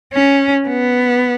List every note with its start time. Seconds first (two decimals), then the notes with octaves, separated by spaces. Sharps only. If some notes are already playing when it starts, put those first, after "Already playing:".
0.13 C#4
0.68 B3